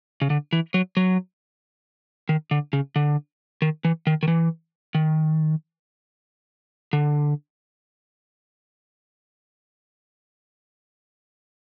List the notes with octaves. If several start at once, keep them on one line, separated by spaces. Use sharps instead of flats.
C#3
D3
E3
F#3
F#3
D#3
D3
C#3
D3
D#3
E3
D#3
D#3
E3
D#3
D3